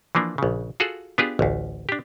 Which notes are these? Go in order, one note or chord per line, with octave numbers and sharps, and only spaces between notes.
E3 F3 A#3 D4
A#1 C#3
F4 F#4 G#4 A4 F#5
B3 D4 F4 G4 G#4
A1 D2
D4 G4